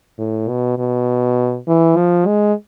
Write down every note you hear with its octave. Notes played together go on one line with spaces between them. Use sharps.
A2
B2
B2
E3
F3
G#3